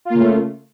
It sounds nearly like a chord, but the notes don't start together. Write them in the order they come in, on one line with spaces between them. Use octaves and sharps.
F4 A#3 C#3 A3